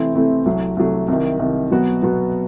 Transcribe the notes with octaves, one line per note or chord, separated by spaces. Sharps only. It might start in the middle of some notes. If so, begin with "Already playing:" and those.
Already playing: C3 E3 A3 C4 E4
C3 E3 A3 C4 E4
C2 C3 F#3 A3
C2 C3 F#3 A3
C2 C3 D#3
C2 C3 D#3
B2 F#3 B3 F#4
B2 F#3 B3 F#4